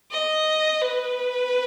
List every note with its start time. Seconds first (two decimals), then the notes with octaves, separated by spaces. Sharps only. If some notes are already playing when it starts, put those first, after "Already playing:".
0.12 D#5
0.81 B4